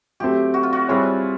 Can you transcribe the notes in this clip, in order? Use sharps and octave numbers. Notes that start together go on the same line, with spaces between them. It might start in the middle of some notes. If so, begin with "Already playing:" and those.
F#3 A3 C4 G4
F#4
F4
F#4
G3 C4 E4 F4 G#4 C#5